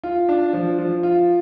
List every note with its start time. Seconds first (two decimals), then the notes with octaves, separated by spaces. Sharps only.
0.03 F4
0.29 D4
0.53 F3
0.79 F3
1.03 F4